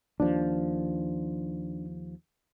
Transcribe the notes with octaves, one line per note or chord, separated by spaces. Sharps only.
D#2 F3 D4